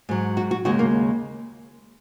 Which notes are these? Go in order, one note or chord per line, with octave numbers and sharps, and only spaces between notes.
G#2 F#3
F#4
F#4
D#2 C#3 G#3 F#4
A#3